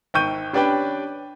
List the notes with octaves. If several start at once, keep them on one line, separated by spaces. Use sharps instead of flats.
G#1 G5 C#6 G6 D#7
C#4 D4 G4 B4 D5 G5